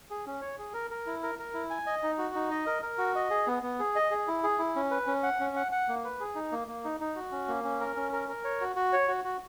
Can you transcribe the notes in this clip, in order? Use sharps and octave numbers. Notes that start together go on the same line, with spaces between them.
G#4
C#4
C#5
G#4
A#4
A#4
E4
A#4
A#4
E4
G#5
D#5
D#4
F#4
D#4
D#5
A#4
A#4
F#4
D#5
G#4
B3
B3
G#4
D#5
G#4
E4
G#4
E4
C#4
B4
C#4
F#5
C#4
F#5
F#5
A#3
B4
G#4
D#4
A#3
A#3
D#4
D#4
F#4
C#4
A#3
C#4
A#4
C#4
A#4
A#4
C#5
F#4
F#4
C#5
F#4
F#4